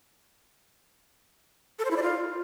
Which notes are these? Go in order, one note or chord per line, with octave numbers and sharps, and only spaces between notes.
A4
C5
E4
D5
F4